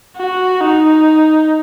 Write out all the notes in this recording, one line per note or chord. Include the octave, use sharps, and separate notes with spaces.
F#4
D#4